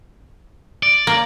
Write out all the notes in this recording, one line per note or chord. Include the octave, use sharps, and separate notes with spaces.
D5
A#3